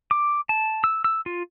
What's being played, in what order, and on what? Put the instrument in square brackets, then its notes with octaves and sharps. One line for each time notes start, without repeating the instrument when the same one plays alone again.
[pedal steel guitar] D6
A5
E6
E6
F4